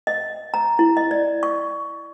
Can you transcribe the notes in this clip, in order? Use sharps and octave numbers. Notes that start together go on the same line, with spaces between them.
D#5
A#5
E4
D#5
D5
C#6